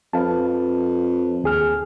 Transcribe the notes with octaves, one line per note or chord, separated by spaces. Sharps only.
F2 B4 F5 A5
D#2 G#4 F6